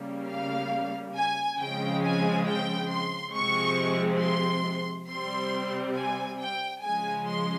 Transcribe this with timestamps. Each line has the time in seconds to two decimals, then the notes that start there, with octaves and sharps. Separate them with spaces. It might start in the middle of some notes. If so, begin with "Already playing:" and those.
Already playing: C#3 G3 A#3
0.28 F5
1.15 G#5
1.58 C#3 F3 G#3 C4 G5
2.03 G#5
2.46 G5
2.89 C6
3.33 C3 F3 G#3 C4 C#6
4.21 C6
5.08 C3 G3 C4 C6
5.96 G#5
6.40 G5
6.83 C#3 F3 G#3 G#5
7.27 C6